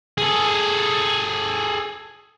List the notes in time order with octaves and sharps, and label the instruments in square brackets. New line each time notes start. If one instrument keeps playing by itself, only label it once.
[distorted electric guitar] G#4 A4